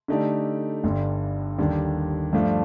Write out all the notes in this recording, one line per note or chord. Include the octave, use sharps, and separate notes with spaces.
D3 A3 D#4 G4 D5
G1 G2 D3
D#2 D3 G3 D4
G2 F3 A3 D4 F4